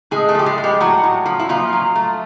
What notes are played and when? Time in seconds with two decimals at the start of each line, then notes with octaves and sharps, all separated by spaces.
0.11 A2 G#3 G#4
0.28 A3 A4
0.35 F3 G4
0.46 G#3 G#4
0.58 G#3
0.64 G3 G4
0.80 A2 F#3 F#4
1.04 A2
1.26 F3
1.39 E4
1.49 A#2 F3 F4
1.73 F#3
1.95 A3